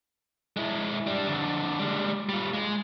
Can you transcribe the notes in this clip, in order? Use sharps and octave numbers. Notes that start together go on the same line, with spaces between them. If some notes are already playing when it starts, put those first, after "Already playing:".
G#3 E4
G3 D4
F2 D3
G3 G#3
G3 F4
G#3